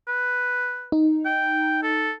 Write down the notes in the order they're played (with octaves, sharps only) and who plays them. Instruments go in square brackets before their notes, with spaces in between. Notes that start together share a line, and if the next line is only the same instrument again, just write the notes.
[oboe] B4
[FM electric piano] D#4
[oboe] G5
A4